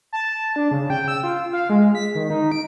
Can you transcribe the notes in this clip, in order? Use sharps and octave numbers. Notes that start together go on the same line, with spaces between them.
A5
D4
C#3
G5
E6
F4
F5
G#3
B6
D#3
D#4
D7